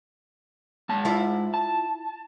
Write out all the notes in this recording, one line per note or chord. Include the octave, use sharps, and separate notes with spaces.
G#2 A5
E4 F4 E5
A5